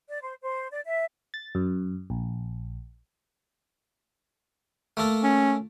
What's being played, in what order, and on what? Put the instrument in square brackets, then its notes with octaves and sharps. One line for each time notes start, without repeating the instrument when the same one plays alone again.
[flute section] D5
C5
C5
D5
E5
[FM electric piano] A6
F#2
A#1
[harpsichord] A3 A#3 A4
[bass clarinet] C#4